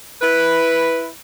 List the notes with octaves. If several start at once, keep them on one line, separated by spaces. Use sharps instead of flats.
E4 B4